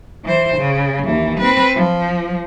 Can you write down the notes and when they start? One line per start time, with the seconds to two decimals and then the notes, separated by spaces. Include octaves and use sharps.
0.25 E3 C5
0.58 C#3
1.05 D#2 E3
1.39 C4 B4
1.75 F3